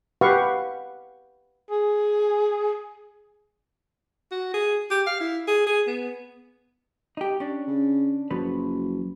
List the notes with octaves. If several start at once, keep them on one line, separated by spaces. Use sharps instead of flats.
G4 B4 F5 F#5 C#6
G#4
F#4
G#4
G4
F5
E4
G#4
G#4
B3
D#4 G4
C#4 D4
C#3
F#1 F3 F#3 B4